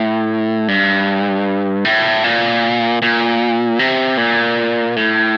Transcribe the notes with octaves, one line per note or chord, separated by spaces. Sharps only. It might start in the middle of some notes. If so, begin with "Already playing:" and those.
Already playing: A2
G2
A2
A#2
A#2
C3
A#2
A2